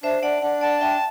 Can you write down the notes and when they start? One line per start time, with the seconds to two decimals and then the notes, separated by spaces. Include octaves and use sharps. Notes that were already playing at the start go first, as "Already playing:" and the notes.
0.03 D4 C5 E5
0.23 D4 D5 F#5
0.42 D4 D5 F#5
0.61 D5 F#5 A5
0.81 D4 E5 G5